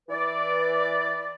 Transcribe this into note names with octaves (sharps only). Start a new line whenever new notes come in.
E3 B4 D5